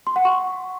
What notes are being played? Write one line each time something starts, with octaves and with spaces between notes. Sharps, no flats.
C6
F#5
C#6